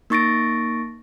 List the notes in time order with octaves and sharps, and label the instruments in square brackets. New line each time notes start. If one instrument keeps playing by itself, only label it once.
[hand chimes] A#3 D#4 C#6 A6 A#6 D7